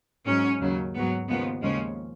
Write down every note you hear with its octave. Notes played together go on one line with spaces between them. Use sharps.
G#2 F#3 C#4
D#2 C#3 F#3
G#2 F#3 B3
D#2 C#3 F3 G#3 B3
D#2 C#3 F3 G#3 C#4